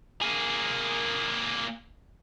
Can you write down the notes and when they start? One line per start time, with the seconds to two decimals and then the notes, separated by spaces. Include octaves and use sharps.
0.22 A#3 G#4